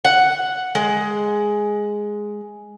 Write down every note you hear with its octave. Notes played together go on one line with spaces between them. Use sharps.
F#5
G#3